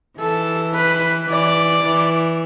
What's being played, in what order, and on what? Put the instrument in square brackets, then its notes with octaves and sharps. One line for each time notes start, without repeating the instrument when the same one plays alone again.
[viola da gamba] E3 [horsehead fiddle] A4
[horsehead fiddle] B4
[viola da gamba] E3 [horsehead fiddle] D5
[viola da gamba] E3